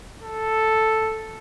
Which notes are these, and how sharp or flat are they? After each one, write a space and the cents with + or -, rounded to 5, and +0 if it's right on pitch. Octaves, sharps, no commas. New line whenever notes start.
A4 +0